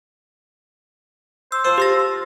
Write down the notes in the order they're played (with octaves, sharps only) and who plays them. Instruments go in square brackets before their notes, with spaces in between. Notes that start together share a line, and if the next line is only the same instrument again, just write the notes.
[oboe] C5 [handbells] E6
[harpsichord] F3 C5 [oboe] F4
[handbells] G4 E6 A#6